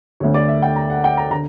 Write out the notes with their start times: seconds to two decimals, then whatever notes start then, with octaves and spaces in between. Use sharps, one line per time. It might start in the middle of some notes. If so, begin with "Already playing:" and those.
0.20 D2 D3 C#5
0.34 D5
0.48 E5
0.62 G5
0.76 A#5
0.90 F#5
1.04 G5
1.17 A#5
1.31 D3 A#5